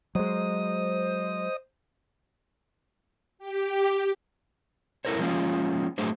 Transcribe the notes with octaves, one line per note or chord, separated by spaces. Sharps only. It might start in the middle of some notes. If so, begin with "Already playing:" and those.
F#3 G#3 C5 D#5
G4
E4 A4 A#4 C5 C#5
F3 G#3 A#3 B3 C#4 F4
F#3 A3 D4 G#4 C5